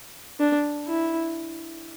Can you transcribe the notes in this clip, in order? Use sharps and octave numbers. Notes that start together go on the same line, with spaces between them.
D4
E4